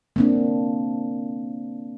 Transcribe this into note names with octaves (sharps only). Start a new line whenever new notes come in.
A#3 C4 D4